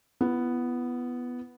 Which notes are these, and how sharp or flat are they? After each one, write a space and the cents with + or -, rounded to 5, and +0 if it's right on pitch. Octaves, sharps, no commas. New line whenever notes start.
B3 +0 E4 +40